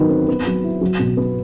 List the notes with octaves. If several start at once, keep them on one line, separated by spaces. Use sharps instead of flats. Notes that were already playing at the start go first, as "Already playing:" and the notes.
Already playing: D#3 F#3 B3
C4
B3
F#3
E4
F#3
B2
B3